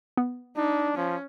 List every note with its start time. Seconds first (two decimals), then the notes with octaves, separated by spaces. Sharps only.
0.17 B3
0.57 D4 D#4
0.97 F3 C#4